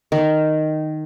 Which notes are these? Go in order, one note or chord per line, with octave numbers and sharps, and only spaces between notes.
D#3